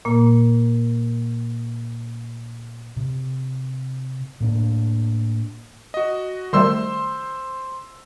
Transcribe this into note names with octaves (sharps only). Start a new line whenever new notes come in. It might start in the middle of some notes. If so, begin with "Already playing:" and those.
A#2 A#3
C3
A2 A#3 D4
F#4 D#5
D#3 G3 A3 C5 C6 E6